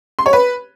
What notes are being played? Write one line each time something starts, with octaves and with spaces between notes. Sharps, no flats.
C6
C#5
B4